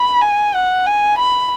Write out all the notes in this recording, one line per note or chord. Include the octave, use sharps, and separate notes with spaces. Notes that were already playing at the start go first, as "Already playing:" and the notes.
Already playing: B5
G#5
F#5
G#5
B5